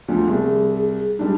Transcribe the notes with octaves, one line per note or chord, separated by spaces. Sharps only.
D2 D3 F3
C2 G#4
G3 G#3 D4 D#4